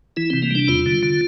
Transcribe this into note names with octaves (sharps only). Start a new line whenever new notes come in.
E3 E4
C3 C4
A#3
G3 D4
E2 F4
D3
D3